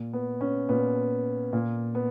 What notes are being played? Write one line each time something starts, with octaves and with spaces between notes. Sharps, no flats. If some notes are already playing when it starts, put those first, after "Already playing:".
Already playing: A#2
B3
C#4
A#2 B3
A#2
B3